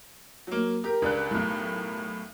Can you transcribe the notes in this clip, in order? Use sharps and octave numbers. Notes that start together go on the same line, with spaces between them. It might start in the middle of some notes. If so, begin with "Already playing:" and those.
F#3 A#3
G4 A#4
C#2 D4 F#6
B1 A2